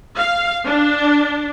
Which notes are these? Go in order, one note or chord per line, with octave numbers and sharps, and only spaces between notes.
F5
D4